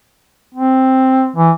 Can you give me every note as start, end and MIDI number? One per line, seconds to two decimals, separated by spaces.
0.55 1.29 60
1.36 1.51 52